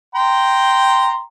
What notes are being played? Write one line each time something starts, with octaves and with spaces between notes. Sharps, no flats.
G5 A#5 C6